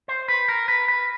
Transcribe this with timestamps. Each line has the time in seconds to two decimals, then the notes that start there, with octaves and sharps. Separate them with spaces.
0.08 C5
0.28 B4
0.48 A#4
0.68 B4
0.88 B4